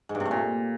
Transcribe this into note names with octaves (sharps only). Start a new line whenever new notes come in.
G#2
G2
C3
A3
A#2